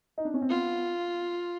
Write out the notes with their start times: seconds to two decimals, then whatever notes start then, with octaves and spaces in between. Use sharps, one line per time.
0.18 D#4
0.25 D4
0.34 C#4
0.42 C4
0.50 B3 F4